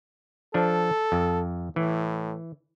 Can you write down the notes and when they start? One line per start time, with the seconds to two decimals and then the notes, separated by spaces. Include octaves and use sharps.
0.54 F3 D4 A4
1.12 F2
1.76 A2 E3